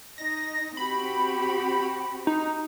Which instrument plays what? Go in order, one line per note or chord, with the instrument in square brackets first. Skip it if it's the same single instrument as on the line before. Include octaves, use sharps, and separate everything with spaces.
[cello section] D#4 [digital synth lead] A#6
[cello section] C4 F#4 G4 [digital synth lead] B5
[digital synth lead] D#4